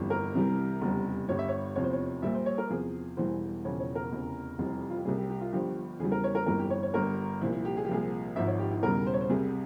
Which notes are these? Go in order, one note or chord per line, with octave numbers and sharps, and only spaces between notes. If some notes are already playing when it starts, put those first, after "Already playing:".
Already playing: G1 F2 E3 G3
A#4
C2 C3 E3 G3
F1 E2 C#3 G3
G1 G2 G3 C#5
E5
C#5
F1 E2 C3 F3 C#5
C5
C#5
A#1 A#2 G3 E5
C5
C#5
A#4
E2 C3 F3 G#4
E1 E2 E3 G3 C5
E1 E2 C#3 F3 C#5
C#5
A#4
F1 E2 C#3
F1 F2 E3 G3
F4
G4
C2 C3 G3 G#4
G4
G4
F4
G1 G2 F3 G4
E2 C#3 E3 G3 G#4
A#4
C#5
A#4
G1 F2 E3 G3 A#4
G4
C#5
C#5
G1 G2 G3 A#4
C2 A#2 F3 E4
E4
G4
G#4
G4
C2 A#2 F3 G#4
G#1 G#2 F3 E5
C#5
G4
E4
E1 E2 C#3 G3 A#4
C5
C#5
C5
C2 C3 G3 G#4